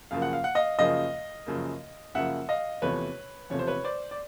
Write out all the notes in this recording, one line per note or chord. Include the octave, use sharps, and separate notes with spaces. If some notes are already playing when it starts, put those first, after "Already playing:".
F#2 C#3 F3 A#3 F5
F#5
F5
F#5
D#5 F5
F#2 C#3 F3 A#3 D#5 F5
F#2 C#3 F3 A#3
F#2 C#3 F3 A#3 E5 F#5
D#5 F5
E2 C3 F3 A3 B4 C#5
E2 C3 F3 A3 C#5
C5
B4 C#5
C5 D5
D5